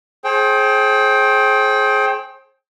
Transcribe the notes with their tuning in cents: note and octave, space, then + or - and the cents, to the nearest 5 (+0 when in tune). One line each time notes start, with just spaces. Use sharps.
G#4 +30 C5 +35 G5 +0